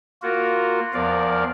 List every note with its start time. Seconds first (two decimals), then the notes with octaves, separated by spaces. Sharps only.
0.22 A#3 F4 F#4 A#4
0.94 E2 F3 A#4 D5 F5